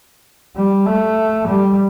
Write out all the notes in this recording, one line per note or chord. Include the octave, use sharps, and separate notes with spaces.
G3
A3
G3